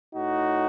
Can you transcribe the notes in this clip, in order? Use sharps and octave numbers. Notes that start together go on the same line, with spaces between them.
A2 D#4 F#4